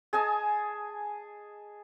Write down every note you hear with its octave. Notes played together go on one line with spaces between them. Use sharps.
G#4 D#5 G#5 A5